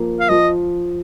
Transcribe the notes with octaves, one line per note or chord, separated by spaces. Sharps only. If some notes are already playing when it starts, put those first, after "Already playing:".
Already playing: F3 A#3
F5
F3 D#5